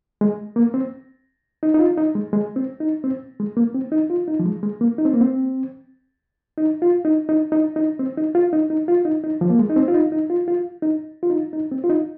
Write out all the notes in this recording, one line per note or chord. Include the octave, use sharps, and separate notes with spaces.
G#3
A#3
C4
D#4
D#4
F4
D#4
G#3
G#3
C4
D#4
C4
G#3
A#3
C4
D#4
F4
D#4
F3
G#3
G#3
A#3
D#4
C4
A#3
C4
D#4
F4
D#4
D#4
D#4
D#4
C4
D#4
F4
D#4
D#4
F4
D#4
D#4
F3
A#3
G#3
D#4
C4
F4
D#4
D#4
F4
F4
D#4
F4
D#4
D#4
C4
F4
D#4